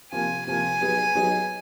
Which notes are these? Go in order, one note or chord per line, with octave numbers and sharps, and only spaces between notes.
C3 F3 A#3 G#5
C3 F3 A#3 G#5
F#3 B3 D#4 G#4
F#3 B3 D#4 G#4